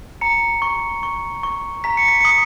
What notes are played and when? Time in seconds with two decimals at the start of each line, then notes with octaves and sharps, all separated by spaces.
0.21 A#5 C#7
0.62 C#6
1.03 C#6
1.43 C#6
1.84 A#5 B6
1.97 C#7
2.08 B6
2.21 D#6 C#7